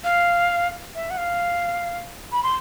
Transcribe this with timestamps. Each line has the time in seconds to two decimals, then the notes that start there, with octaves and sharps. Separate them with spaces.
0.04 F5
0.95 E5
1.10 F#5
1.17 F5
2.32 B5
2.43 C6